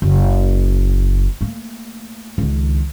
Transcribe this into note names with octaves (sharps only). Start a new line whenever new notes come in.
F#1
A3 A#3
C#2 D#3